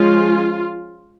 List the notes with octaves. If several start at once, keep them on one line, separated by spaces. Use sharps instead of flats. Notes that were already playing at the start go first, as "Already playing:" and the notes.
Already playing: F3 G#3 C#4 F4